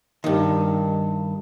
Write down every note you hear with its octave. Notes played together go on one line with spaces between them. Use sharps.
G2 D#3